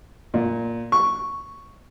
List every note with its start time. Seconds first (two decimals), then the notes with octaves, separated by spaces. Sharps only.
0.34 A#2
0.92 C#6